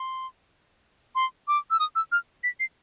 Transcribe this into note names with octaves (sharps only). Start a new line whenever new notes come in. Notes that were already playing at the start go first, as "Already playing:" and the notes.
Already playing: C6
C6
D6
E6
D#6
E6
F6
B6
C7